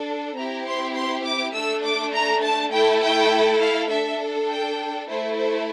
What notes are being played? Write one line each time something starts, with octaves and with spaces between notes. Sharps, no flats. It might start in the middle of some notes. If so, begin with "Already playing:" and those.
Already playing: D4 A4
C4 E4 G4 A#5
C6
C6
D6
A3 D4 A4 E6
D6
A#5
A5
A3 E4 A4 G5
G5
F5
D4 A4 E5
G5
A3 E4 A4 C5
C5